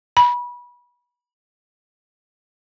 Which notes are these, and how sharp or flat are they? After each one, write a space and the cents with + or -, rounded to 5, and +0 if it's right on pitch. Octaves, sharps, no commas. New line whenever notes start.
B5 -25